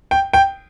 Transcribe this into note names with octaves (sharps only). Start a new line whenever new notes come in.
G5
G5